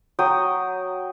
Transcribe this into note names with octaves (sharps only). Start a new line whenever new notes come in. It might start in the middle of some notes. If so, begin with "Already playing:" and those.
F#3 G5 D#6